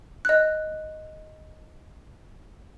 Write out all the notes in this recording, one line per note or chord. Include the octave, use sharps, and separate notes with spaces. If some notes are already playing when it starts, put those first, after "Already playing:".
D#5 F#6